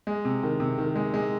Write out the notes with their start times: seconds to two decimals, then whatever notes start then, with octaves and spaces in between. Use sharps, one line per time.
0.07 G#3
0.25 C3
0.43 D#3
0.60 C3
0.78 D#3
0.96 G#3
1.14 G#3